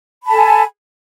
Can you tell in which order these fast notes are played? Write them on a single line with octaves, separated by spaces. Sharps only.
B5 A5 A4 G#5